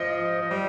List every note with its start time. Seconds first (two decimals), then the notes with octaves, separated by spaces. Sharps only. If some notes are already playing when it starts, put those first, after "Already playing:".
Already playing: F3 D#5
0.41 F3
0.51 G3